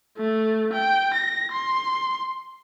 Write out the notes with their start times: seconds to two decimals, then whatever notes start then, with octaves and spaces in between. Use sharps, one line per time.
0.18 A3
0.73 G5
1.14 A#6
1.52 C6